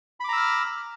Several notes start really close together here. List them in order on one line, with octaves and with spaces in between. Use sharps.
B5 D6 A#5 E6 F6